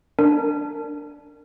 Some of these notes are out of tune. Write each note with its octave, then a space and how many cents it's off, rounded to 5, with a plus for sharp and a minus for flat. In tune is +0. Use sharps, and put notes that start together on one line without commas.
D4 +0 A#4 -20